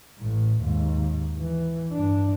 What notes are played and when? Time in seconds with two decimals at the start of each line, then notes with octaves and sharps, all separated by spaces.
0.18 A1 A2
0.60 D#2 G#2
1.39 E3
1.93 G2 D4